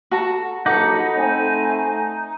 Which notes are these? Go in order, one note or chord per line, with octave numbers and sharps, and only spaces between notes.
F#4 A4 A#5
A#1 F#3 D#4 A4 B4 F#5 D6
A3 C4 G#5